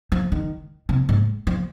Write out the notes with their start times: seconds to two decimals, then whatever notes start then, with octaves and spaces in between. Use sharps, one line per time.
0.12 F3
0.32 D#3
0.89 C3
1.09 G#2
1.47 F3